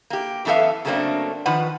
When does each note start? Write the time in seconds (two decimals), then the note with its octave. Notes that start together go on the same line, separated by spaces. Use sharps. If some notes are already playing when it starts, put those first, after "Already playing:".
0.10 A#3 G4
0.45 F#2 E3 B3 A4 E5 F5
0.85 C#3 F#3 A3 A#3 C4 D4
1.46 D#3 F3 B4 F#5